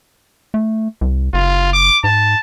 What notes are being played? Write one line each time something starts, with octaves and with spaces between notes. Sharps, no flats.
A3
C2
F#1 F4
D6
G#2 A5